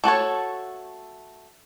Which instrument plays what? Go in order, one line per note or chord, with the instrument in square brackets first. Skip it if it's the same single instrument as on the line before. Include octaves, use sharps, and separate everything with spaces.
[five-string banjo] A3 F#4 A4 C#5